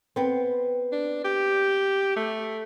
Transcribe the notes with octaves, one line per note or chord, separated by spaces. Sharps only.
B3 C4
D4
G4
A3